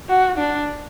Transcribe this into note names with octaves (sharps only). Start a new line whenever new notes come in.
F#4
D4